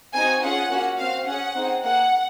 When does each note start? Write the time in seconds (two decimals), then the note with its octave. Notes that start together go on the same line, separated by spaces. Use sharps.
0.13 C4 D#4 F#4 G#5
0.42 C#4 F4 G#4 F#5
0.69 A#3 C#4 F#4
0.97 C4 F#4 F5
1.26 C#4 G#4 F#5
1.54 C4 D#4 G#4
1.83 A#3 D#4 G#4 F#5